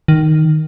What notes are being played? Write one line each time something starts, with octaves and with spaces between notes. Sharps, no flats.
D#3